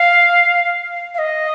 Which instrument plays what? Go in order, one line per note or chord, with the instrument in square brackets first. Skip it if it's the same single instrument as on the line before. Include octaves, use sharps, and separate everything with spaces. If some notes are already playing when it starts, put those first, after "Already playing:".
Already playing: [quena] F5
F5
D#5